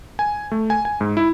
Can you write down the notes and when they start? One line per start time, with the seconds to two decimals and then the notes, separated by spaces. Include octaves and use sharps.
0.19 G#5
0.52 A3
0.70 G#5
0.85 G#5
1.01 G#2
1.17 E4